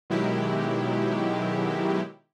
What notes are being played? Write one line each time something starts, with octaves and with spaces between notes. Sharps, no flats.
B2 D#3 F#3 G#3 E4 G4